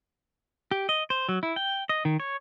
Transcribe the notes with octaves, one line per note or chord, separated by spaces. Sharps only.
G4
D#5
C5
F#3
E4
G5
D#5
D#3
C#5